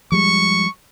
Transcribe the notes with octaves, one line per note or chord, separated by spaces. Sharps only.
F3 G3 G#3 C#6